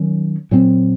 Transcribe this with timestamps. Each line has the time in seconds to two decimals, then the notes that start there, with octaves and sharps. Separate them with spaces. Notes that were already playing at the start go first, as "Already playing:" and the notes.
Already playing: D#3 F#3 C#4
0.51 A#2 F#3 C4